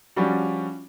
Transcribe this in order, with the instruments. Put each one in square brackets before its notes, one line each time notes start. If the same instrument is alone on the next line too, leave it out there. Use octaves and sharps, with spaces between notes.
[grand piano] F3 G3 C#4 D4 F#4